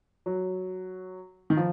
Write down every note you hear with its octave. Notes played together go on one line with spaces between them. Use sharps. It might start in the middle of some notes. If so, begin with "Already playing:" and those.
F#3
D#3
F3